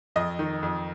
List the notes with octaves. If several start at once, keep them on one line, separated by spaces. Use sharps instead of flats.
F2 D#5
D#3
F2